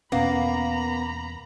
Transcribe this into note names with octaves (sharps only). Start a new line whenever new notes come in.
E2 B2 A#3 B3 C#4 A#5 B5